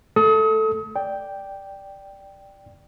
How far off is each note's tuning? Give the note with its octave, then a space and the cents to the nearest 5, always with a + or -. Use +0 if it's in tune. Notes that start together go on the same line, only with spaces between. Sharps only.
A3 +0 A4 +0 D#6 +35
D5 +5 G5 +0